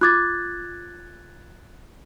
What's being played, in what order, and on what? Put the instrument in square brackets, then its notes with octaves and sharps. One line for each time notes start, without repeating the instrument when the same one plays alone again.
[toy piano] F4 D6 [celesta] F#6 G#6 A6